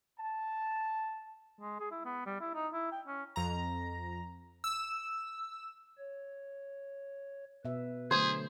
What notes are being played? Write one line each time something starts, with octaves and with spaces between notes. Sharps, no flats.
A5
G#3
G#4
E4
B3
G3
E4
D#4
E4
G5
C#4
F2 A#5
E6
C#5
B2 B4 E5
D3 F#3 A3 G#4 C5